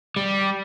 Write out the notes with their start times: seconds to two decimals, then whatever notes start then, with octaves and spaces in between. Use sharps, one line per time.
0.16 G3